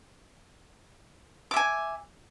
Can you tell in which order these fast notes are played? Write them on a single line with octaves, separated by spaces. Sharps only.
D6 E5 G#5